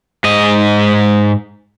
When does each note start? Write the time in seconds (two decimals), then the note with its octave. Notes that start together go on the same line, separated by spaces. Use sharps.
0.24 G#2 D#5